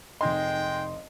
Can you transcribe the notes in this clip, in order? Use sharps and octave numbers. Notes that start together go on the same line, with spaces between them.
F1 G#3 D#4 D#5 G5 C6